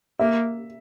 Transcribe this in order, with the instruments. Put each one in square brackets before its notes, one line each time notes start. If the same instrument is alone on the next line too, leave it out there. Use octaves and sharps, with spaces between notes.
[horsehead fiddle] A#3 [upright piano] E5